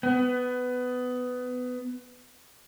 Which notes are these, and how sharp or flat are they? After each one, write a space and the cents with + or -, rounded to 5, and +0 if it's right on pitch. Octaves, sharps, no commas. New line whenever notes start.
B3 +15